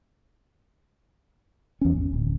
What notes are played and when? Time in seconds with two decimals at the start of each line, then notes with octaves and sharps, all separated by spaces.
1.81 E2 C#4
1.94 G#1
2.13 D1